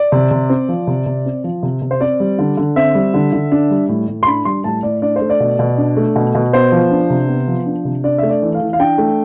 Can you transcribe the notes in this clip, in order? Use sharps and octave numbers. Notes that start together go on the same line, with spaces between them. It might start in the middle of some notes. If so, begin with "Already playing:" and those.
Already playing: D5
C3
C3
C4
F3
C3
C3
C4
F3
C3
C3
C5
C4 D5
G3
D3
D3
C4 E5
G3
D3
D3
D4
G3
A2
A2
C6
D4 B5
G3 C6
A2 A5
A2 D5
D4 D5
C5
A3
D5
B2
B2
D4
A3
B2
B2
B3 C5
F3
D4
C3
B3
F3
D4
C3
D4 D5
A3 E5
D5
E3
F5
E3
F5
D4 G5
A3